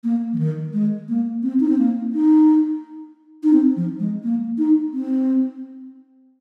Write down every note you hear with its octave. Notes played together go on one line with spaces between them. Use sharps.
A#3
F3
D#3
G#3
A#3
C4
D#4
C4
A#3
D#4
D#4
C4
F3
G#3
A#3
D#4
C4